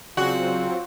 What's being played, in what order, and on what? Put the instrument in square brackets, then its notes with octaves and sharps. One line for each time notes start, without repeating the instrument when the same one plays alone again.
[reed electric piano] C#3 G#4 D5 [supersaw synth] F#3 C4 [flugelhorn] F4 [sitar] F#4